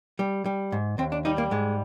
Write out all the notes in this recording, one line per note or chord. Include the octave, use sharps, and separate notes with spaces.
G3
G3
G#2
D#2 C4
D4
G3 D#4
A#3
G#2 G#3